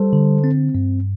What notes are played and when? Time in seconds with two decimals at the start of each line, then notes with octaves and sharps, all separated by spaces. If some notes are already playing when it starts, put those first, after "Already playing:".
Already playing: G3 A4 C5
0.13 D3
0.44 C4
0.75 G2